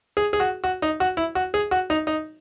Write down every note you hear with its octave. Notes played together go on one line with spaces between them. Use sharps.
G#4
G#4
F#4
F#4
D#4
F#4
E4
F#4
G#4
F#4
D#4
D#4